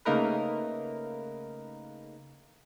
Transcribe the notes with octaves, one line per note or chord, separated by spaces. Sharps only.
C#3 A3 A#3 D#4 A#4 B4